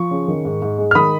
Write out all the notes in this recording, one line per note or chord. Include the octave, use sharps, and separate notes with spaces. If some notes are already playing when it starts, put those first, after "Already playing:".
Already playing: F3 C#6
C#3
D#3
G#2
G#2
G#3
F6
D#3 B5 D#6